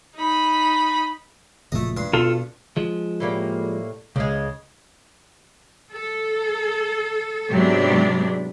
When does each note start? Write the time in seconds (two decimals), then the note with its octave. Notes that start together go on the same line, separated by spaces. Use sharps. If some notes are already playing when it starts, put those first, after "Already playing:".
0.15 D#4 B5
1.72 F#1 A#2 F3 A3 D#5
1.97 G2 C6
2.13 B2 F4 A4
2.77 F3 G#3
3.20 A2 G3 A#3
4.16 C#2 C#3 G#3
5.90 A4
7.50 G#2 C3 F#3 G#3 B3 D4